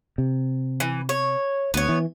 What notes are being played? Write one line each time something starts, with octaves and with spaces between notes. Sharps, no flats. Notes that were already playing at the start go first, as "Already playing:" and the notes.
C3
E3
C#5
D2 B3 C#5
E3